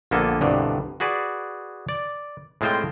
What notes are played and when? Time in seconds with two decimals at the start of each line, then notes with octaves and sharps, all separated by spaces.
0.11 A#1 D3 A#3 B3 A4 G#5
0.41 C2 G2 B2 D3
1.00 F#4 G#4 B4 D5
1.89 D5
2.61 A2 G#3 C4 F4 C5 G5